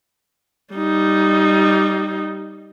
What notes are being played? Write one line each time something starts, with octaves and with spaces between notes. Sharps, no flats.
G3 D#4